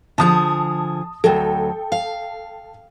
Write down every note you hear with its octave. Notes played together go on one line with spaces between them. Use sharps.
D3 F3 G#4 A5 D#6
D2 F#3 A4 G5
F5